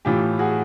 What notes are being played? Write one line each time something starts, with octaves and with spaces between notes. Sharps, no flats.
A2 E3 F4 G4
F#4 G#4